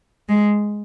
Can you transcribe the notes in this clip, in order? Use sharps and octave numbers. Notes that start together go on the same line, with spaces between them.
G#3